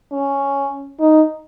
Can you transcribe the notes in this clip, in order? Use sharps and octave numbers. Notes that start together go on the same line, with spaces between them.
C#4
D#4